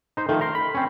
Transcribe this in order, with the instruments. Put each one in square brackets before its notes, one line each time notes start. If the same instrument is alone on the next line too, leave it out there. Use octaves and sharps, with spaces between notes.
[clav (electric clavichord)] D#4 C5
[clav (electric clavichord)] D#3 F3 [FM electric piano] A3
[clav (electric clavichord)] A#4 [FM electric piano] A#5 C6
[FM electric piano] B5
[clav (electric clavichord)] C4 C#4